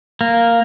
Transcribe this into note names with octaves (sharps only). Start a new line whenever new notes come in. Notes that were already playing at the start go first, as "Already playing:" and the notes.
A#3